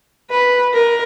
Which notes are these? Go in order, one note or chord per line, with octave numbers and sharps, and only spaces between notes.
B4
A#4